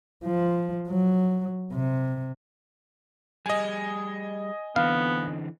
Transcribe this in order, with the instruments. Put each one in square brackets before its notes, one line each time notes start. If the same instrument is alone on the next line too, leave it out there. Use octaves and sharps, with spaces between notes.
[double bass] F3
F#3
C3
[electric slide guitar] G3 G#4 [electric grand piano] D#5 G#5
[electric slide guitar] D3 E3 C4 [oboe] B3 [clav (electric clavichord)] F5